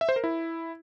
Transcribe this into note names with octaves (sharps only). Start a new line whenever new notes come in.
E5
C5
A#4
E4